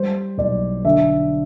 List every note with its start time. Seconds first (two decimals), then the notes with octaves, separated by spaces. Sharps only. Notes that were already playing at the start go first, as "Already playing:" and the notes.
Already playing: G3 C5
0.38 B1 D5
0.85 D3 E5